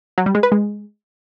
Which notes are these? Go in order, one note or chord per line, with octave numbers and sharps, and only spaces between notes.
F#3
G3
G#3
B4
G#3